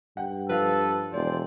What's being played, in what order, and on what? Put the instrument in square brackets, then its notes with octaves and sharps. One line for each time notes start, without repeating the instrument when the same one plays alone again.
[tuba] G2 [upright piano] F#5 G5
[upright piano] F3 F5 [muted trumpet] A4 [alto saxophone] B4
[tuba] E1 [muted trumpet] C5 [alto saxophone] D5